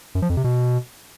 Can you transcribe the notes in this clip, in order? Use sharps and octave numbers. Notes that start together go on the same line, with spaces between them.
F#2
F3
F2
C3
B2